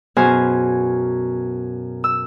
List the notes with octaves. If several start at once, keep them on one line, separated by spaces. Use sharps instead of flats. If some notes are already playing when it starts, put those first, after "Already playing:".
F#2 B2 G#4 C5 G#5 F6
E6